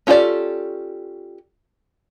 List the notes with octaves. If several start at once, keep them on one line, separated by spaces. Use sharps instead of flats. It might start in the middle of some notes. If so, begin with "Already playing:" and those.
C#4 F4 G4 A4 D5